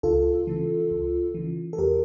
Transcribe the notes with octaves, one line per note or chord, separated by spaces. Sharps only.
C#2 F4 A4
C#3 E3
C#2
C#3 E3
A4
E2 G4 A#4